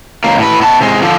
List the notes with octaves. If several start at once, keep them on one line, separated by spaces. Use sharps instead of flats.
C#2 A#3
A2 B4
B3 A5
C3 G#3
D3 F3